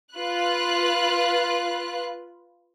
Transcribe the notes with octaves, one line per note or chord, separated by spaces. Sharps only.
F4 B4 F#6